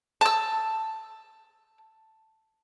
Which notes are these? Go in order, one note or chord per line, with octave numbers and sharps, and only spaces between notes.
A5 E6